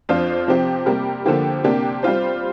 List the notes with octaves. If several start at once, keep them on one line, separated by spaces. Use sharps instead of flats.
F2 F3 D4 F4 C5
C3 F3 C4 G4
C3 G3 A#3 G4 A#4
D3 F3 A#3 G4
C3 A#3 D4 G4
G3 C4 F4 C5